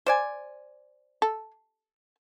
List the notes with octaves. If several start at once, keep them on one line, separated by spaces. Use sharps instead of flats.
C5 D5 G#5
A4